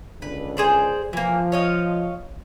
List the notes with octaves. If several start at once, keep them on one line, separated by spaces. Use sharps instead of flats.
C#2 D3 D4 B4
G#4 C5 D5
E3 F3 A#3
C#5 D#5 F5